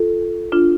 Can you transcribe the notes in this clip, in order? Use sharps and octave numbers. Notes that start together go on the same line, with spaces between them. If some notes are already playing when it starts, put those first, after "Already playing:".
Already playing: F4 A4
D4 F4